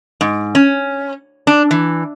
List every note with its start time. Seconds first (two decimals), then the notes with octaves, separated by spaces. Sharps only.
0.21 G#2
0.55 C#4
1.47 D4
1.71 E3